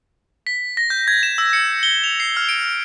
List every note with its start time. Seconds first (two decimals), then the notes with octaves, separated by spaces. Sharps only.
0.47 B6
0.77 A#6
0.90 G6
1.08 G#6
1.23 E7
1.38 E6
1.53 C#7
1.83 G7
2.04 F7
2.20 C7
2.37 F6
2.49 D7